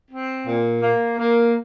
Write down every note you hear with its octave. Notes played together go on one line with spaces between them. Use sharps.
C4
A#2
A#3
A#3